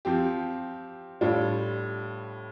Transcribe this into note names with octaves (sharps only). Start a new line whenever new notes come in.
F3 C4 G4
A2 G3 D4 F4